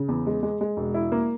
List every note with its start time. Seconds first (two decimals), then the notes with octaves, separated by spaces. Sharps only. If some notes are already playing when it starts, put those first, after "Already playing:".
Already playing: C#3
0.08 E2
0.27 G#3
0.43 G#3
0.61 G#3
0.77 E1
0.94 E4
1.12 A#3